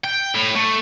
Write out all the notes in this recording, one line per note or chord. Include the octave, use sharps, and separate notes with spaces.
G5
A2
A3